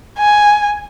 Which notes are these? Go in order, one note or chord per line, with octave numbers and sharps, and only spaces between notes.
G#5